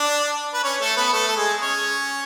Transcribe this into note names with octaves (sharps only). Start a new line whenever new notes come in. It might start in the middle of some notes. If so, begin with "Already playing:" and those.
Already playing: D4 D5
B4
C#4 C#5
A3 A4
B3 B4
A3 A4
A4
G#3 G#4
C#4 C#5